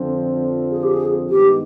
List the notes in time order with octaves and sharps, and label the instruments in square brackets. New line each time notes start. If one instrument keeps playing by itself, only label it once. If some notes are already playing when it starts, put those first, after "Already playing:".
Already playing: [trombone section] F2 D3 F3 C4
[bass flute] G#4
G4
G#4
[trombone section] G2 D#3 G#3 B3 [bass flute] G4